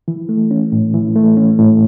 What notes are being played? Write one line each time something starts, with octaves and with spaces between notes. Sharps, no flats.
E3
A3
C#4
A2
E3
A3
C#4
A2